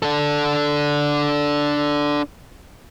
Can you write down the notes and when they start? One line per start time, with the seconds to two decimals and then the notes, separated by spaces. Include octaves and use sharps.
0.02 D4 A4